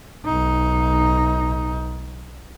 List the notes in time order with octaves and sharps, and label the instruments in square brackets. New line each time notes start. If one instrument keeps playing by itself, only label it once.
[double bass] B1 D#4